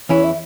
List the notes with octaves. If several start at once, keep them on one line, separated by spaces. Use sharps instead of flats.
E2 E3 C#4 E4 C#5
E5